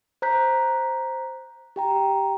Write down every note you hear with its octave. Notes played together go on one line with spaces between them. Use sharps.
C5 A#5 F#6 G6 B6
G4 G5 A#5